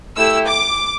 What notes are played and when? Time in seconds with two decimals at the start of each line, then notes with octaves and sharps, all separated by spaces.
0.16 A3 E4 G4 E6
0.47 D6